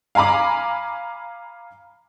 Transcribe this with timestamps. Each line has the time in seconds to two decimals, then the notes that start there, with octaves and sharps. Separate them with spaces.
0.15 F5 G#5 A#5 B5 D6